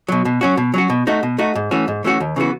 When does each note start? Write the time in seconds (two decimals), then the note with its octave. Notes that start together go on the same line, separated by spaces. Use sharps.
0.08 B2 F#3
0.25 B2
0.41 F#3 C#4 F#4
0.57 B2
0.74 F#3 C#4 F#4
0.90 B2
1.07 A3 D#4 F#4
1.23 B2
1.38 A3 D#4 F#4
1.55 G#2
1.71 E3 A3 C#4 F#4
1.88 G#2
2.04 E3 A3 C#4 F#4
2.20 D#2
2.36 C#3 E3 B3 F#4